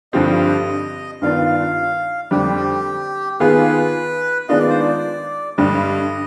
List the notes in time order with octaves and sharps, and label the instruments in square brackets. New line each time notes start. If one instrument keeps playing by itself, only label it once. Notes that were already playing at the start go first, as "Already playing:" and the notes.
[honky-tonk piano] G2 D3 F3 C4 G4 [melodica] D#5
[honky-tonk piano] G2 D#3 B3 D4 F4 [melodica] F5
[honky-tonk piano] F2 D3 G3 [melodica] G4
[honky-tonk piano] D#3 B3 F4 G#4 [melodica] B4
[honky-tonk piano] D#3 G#3 B3 D4 F4 [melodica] D#5
[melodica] D5
C5
D5
[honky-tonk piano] G2 D3 G3 [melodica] D#5